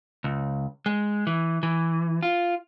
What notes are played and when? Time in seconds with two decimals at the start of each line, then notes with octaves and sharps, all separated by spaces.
0.24 C#2
0.86 G#3
1.27 E3
1.63 E3
2.23 F4